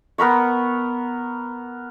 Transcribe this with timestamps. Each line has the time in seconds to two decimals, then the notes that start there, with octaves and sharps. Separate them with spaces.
0.18 B3 A#4 B5 C#6